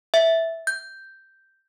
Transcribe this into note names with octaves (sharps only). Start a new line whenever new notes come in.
E5
G6